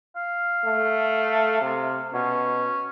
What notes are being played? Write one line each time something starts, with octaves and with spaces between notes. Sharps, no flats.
F5
A3
C3
B2 C#4